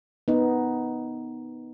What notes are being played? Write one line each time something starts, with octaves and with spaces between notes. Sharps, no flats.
B3 D#4